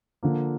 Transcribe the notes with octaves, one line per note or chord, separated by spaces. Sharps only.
D3 F3 A#3